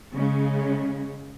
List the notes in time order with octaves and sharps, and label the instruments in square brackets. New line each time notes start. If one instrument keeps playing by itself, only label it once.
[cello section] C#3 G#3 C#4